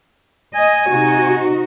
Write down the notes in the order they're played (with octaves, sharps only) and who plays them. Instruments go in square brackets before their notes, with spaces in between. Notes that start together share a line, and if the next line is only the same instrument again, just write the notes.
[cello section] D#5 [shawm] G#5
[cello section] C3 D#4 F#4